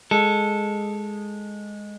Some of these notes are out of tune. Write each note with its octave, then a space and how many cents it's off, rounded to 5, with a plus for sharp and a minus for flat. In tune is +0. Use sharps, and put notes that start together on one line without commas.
G#3 +0 A4 +0